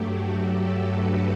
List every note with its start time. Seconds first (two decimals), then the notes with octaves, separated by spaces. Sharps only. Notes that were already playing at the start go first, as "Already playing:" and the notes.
Already playing: G2 F#3 A3 F#4 G4
0.36 A4
0.81 B4